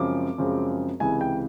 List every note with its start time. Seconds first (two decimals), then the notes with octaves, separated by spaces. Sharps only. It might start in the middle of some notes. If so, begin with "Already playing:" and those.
Already playing: F#2 C#3 F3 G#3 C4 D6
0.38 F#2 C#3 F3 G#3 C4
1.00 C#2 C3 E3 G#3 G#5
1.21 G5